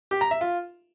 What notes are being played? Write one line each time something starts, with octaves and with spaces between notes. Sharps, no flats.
G4
A#5
E5
F4